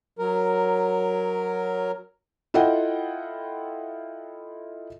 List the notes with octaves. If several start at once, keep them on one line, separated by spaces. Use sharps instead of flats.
F#3 A#4
E4 F4 A4 D#5 F#5 G5